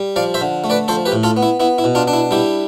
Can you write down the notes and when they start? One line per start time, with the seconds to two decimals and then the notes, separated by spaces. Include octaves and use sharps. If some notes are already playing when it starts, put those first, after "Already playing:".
Already playing: G3
0.16 F3 D5 F5
0.34 C5 E5
0.41 D3
0.64 A3
0.70 B4 D5
0.88 F3 A4 C5
1.06 G4 B4
1.12 A2
1.23 F4 A4
1.37 B3
1.43 E4
1.60 B3 E4
1.78 E4
1.84 B2
1.95 D4 F4
2.08 D4
2.13 E4
2.31 G3 E4 G4